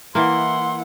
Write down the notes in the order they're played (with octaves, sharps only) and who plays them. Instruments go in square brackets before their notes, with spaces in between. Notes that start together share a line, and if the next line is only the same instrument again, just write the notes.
[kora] E3 A#3 [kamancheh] E4 F#5 [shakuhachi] C6